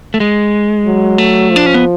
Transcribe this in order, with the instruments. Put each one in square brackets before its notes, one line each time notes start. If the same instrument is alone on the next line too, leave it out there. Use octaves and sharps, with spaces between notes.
[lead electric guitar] A3
G#3
[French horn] F#3
[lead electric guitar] A3
[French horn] F3
[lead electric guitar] D4
C#4
B3